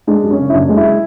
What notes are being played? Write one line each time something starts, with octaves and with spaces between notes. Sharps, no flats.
G#3 D4
F#2
C#4
C#3
E4
F#1 D4
G#3
E4